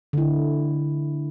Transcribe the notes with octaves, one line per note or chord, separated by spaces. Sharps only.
D3 E4